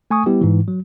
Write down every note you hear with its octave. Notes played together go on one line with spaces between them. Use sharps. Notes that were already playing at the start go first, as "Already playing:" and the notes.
A3 G#5 C#6 D#6
G3 B3 E4 G4
G#2 E3
F#3